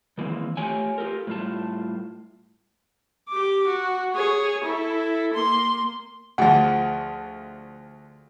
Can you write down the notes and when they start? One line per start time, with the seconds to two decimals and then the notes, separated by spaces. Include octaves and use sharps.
0.18 D#3 E3 G#3 A#3 C4
0.57 A3 F4 G4 C#5 G5 G#5
0.98 F4 G4 A4 A#4
1.27 A2 G3 F4 A5
3.29 G4 D6
3.67 F#4
4.13 G#4 C#5
4.64 E4 A4
5.34 A#3 C6
6.38 D2 F3 G#4 F#5